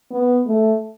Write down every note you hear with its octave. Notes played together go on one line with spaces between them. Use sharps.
B3
A3